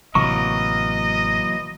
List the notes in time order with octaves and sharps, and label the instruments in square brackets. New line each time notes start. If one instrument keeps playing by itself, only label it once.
[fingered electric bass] A1 C3 [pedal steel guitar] E3 F#3 A#3 [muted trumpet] D#5 [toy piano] C#6